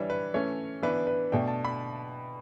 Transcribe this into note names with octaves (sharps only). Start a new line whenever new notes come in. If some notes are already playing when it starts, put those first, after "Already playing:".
Already playing: E3 G3 D4 C#5
B4
E3 A3 C#4 C#5
E3 B3 D4 B4
B4
B2 A3 D4 G5
A5
B5